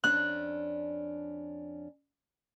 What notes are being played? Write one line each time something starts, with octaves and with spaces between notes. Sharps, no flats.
F2 C#4 D4 F#6